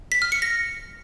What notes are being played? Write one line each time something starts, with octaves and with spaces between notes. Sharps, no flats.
B6
F6
C#7
A#6